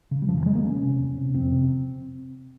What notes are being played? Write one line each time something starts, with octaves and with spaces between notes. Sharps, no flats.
C#3
G3
F2 F3
E3
C#3 G#3
A#3
E2 C#4
C3
E2
C3
F2 C4
C3